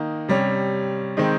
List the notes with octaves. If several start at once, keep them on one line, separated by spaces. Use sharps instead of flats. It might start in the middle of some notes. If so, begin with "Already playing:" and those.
Already playing: D#3 A#3 D#4
C3 G3 C#4
D#3 G#3 C4 D#4